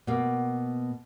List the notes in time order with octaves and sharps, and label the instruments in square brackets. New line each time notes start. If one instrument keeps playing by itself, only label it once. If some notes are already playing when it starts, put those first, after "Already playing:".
[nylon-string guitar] B2 A#3